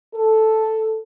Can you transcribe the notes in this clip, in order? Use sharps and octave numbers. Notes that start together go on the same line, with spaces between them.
A4